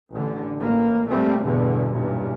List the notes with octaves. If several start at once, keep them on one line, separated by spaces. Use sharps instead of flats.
A1 D3
A1 A#3
A#2 G3 A3 C4
E2 G2 B2 D3
B1 E2 G2 A#2